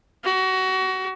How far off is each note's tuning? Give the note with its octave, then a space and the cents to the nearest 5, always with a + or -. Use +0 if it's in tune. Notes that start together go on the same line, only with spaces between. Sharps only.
F#4 +25